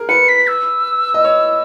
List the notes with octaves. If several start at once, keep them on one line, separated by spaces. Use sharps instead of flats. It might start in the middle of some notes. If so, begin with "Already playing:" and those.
Already playing: G#4 A#4
B4 C#7
B6
E6
D#5
C#5